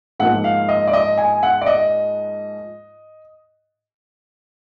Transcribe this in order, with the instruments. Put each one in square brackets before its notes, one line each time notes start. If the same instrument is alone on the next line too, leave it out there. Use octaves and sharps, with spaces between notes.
[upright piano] G#2 F3 A#3 F#5
F5
D#5
D5
D#5
G#5
F#5
D5
D#5